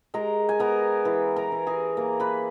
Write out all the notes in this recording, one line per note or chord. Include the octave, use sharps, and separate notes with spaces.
G#3 A#4 A#5
G#5
B3 A#4 A#5
E3
A#4 A#5
E3
G#4 G#5
A#3
B4 B5